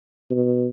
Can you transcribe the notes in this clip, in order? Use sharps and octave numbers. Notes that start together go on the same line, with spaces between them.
B2